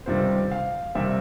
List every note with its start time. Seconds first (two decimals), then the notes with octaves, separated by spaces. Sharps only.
0.06 C#2 C3 D#3 G3 C4 C5
0.51 F5
0.95 C3 D#3 G3 C4 E5